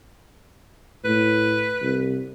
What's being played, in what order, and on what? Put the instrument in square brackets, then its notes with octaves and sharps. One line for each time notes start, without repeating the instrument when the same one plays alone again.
[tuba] A2 [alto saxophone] B4
[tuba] C2